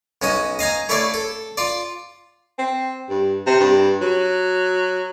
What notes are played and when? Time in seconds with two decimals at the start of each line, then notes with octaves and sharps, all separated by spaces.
0.22 B1 C#4 F#4 D#5
0.59 D#5 F5 G#5 A#5
0.89 A3 E4 C#5 D5 F5
1.14 A4
1.57 F4 D5
2.59 C4
3.09 G2
3.46 C3
3.60 G2
4.02 F#3